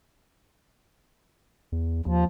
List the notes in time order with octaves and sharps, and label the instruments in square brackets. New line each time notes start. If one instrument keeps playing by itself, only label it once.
[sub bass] E2
[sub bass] D#2 [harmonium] F3